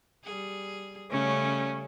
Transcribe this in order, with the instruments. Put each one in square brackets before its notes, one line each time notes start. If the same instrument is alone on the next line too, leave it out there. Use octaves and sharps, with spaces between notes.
[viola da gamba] G3 G#4
[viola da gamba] C#3 G3 [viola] A3 C#4